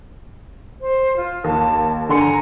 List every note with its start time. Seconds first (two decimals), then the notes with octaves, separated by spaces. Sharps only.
0.81 C5
1.17 F4
1.44 D#2 A5
2.09 D3 G#5 C6 C#7
2.21 A#5